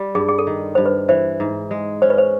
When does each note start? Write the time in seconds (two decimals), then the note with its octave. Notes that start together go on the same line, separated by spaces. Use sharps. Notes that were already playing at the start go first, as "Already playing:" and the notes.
Already playing: G3
0.15 G2 G#4
0.28 G#4
0.39 A4
0.47 D#3
0.75 G2 C5
0.86 B4
1.09 E3 C5
1.40 G#2
1.71 G#3
2.02 C#4 C5
2.10 B4
2.18 C5